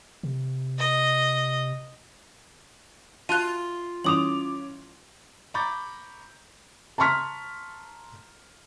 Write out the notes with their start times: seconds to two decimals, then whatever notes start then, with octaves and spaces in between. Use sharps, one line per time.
0.23 C3
0.79 D#5
3.29 F4 F#4 A5 F#6 D#7
4.04 E3 G3 C#4 E4 D6 D#6 F7 F#7
5.54 A#5 B5 C#6 D6 G6 A6
6.98 A5 A#5 C6 C#6 F6 B6